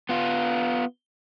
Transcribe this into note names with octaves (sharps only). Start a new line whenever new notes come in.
B3 F4